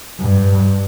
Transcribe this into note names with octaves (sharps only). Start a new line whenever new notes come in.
G2